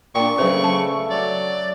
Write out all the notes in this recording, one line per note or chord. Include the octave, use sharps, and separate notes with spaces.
A#2 D4 G5 C#6
C#3 F#3 A3 B4 C5
A5
F#3 D5